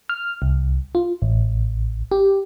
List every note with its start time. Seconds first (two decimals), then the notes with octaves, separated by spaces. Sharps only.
0.09 F6
0.42 C2
0.95 F4
1.22 A1
2.12 G4